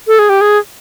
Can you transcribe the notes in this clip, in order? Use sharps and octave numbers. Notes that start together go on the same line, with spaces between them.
A4
G#4
G4
G#4